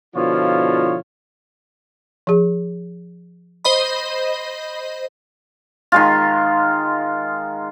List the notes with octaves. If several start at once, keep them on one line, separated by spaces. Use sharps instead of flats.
B2 D3 F3 E4 F4 C#5
F3 G#4
C5 D#5 B5
D#3 G#3 F4